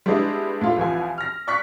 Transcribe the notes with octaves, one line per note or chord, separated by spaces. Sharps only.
G3 G#3 B3 D4 E4 D#5
A2 F4
C2 E3 F3 G#5
F6 A#6
D5 C#6 F#6 B6